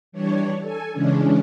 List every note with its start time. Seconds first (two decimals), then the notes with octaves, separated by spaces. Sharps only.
0.12 E3 G3 D4 C#5
0.60 A4 G#5
0.93 C#3 E3 G#3 C#4 D4